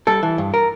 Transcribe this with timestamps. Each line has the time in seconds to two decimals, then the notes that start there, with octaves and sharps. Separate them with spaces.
0.07 G3 A4
0.23 E3
0.38 G2
0.54 A#4